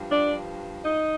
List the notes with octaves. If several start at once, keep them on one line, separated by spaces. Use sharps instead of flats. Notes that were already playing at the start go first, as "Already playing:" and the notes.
Already playing: G2 F3
D4 D5
D#4 D#5